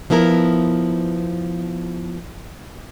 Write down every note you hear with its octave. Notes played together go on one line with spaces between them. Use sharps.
F3 B3 E4 A#4